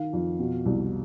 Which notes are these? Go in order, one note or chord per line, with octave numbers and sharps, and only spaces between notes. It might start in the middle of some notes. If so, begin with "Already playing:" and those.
Already playing: D#3 F5
F2
B2
C2